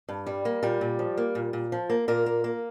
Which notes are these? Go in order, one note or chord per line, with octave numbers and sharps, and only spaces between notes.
G2
G3
A#3
A#2 G3 G4
A#2
F3
A#3
A#2
A#2
F3
A#3
A#2 A#3 A#4
A#3
A#3